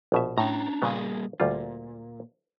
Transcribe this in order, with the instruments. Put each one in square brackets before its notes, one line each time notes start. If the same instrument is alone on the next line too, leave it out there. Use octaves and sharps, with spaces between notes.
[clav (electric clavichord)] A#1 B2 E5
[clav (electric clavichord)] A2 [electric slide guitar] C#4 D4 A#5
[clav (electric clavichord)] A#2 C#3 B3 [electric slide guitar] G3 A#3 G#4
[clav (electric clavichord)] D2 G3 F4 [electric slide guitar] A#2